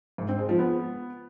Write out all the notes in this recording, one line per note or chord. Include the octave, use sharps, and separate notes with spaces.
G#2
C4
G#3
F3
B3